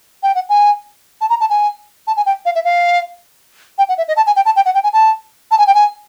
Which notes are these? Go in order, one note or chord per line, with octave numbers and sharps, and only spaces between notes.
G5
F#5
G#5
A5
A#5
A5
G#5
A5
G#5
G5
F5
E5
F5
G5
F#5
E5
D#5
A5
G#5
G5
A5
G5
F#5
G5
G#5
A5
A5
G#5
G5
G#5